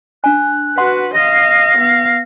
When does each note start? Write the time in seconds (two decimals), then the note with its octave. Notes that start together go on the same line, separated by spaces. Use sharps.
0.24 D4 G#5 F#6
0.78 F#4 B4 F#5 C6
1.14 D#5 F5 A#6
1.78 B3 F5